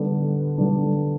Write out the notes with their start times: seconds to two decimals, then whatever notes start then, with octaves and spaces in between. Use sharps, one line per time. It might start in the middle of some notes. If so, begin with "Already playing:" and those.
Already playing: D3 G3 B3 D4
0.58 D3 G3 B3 D4